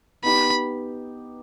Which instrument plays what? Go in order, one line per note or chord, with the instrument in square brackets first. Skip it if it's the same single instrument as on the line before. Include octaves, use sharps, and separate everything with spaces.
[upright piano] B3 D#4 G4 [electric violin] B5